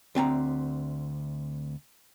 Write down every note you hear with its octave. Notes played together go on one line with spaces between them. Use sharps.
D2 C4 A5 A#5